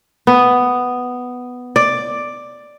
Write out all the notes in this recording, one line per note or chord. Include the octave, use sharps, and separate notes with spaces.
B3
D5